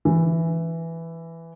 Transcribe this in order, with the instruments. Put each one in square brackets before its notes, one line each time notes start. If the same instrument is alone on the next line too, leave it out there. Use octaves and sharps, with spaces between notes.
[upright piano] E3